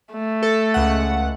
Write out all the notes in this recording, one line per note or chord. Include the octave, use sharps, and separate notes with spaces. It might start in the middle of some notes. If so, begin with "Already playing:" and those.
A3
A4
C#2 F#5